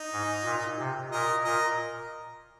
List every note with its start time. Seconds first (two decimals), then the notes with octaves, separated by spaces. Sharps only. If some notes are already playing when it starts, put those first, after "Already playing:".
Already playing: D#4
0.12 G#2
0.44 A#2
0.78 C3
1.12 A#2 A#4 D#5
1.44 A#2 A#4 D#5